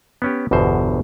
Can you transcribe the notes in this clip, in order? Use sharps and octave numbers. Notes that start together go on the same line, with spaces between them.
B3 C#4 G4
G1 E2 B2 D3 C5